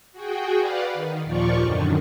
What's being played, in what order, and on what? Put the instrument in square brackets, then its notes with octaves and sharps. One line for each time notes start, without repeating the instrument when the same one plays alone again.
[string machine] F#4 G#4 G5
B4 D5 F5 F#5
D#3
D#2 A#2 F3 F4 D5 C#6
F#2 D3 D#3